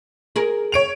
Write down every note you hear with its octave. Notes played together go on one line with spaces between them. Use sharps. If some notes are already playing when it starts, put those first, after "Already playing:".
G#4 A#4
C#5 D7 F7